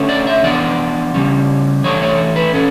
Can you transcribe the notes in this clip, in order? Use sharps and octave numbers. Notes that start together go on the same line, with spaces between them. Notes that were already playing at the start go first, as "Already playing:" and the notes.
Already playing: D3 A3 C#4
D5
E5
E3 B3 D4 D5
C#3 G3 C#4
E3 A3 D4 C#5
C#5
B4
C#4 A4